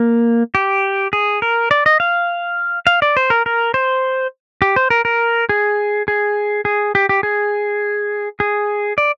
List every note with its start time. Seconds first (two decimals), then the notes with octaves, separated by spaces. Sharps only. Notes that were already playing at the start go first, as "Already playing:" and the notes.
Already playing: A#3
0.55 G4
1.13 G#4
1.42 A#4
1.71 D5
1.86 D#5
2.00 F5
2.87 F5
3.02 D5
3.17 C5
3.30 A#4
3.46 A#4
3.74 C5
4.62 G4
4.76 C5
4.90 A#4
5.05 A#4
5.49 G#4
6.08 G#4
6.65 G#4
6.95 G4
7.09 G4
7.23 G#4
8.40 G#4
8.98 D5